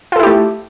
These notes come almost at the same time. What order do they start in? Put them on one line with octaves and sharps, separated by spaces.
F4 A4 E4 G4 A3